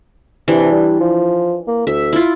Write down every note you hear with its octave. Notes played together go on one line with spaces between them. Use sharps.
C3 E3 D4
G3
F3
A#3
D2 E5
E4 F4